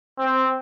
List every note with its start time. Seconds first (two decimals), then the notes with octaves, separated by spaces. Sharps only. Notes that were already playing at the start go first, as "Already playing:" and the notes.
0.18 C4